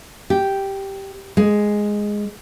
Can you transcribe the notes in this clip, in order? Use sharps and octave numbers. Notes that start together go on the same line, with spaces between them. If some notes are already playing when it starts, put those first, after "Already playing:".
G4
G#3